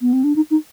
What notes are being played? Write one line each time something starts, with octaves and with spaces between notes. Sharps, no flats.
B3
C4
D4
D#4
D#4